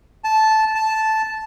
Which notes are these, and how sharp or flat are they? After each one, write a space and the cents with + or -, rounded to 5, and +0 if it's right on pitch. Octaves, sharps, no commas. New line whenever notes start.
A5 -10
A5 -5